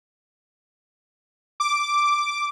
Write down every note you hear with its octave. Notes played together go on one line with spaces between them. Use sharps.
D6